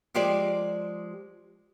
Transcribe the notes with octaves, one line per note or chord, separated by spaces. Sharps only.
F3 G#3 G4 C5 D5